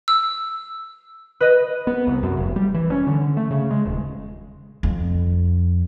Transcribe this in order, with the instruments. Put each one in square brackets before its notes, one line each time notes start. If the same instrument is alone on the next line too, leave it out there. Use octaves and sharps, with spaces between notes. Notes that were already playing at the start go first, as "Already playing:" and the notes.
[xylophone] E6
[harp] B4 D#5
[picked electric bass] B3
C2
F#2
F1
G3
E3
C#4
D3
A3
C#3
G#3
D#1
[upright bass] F2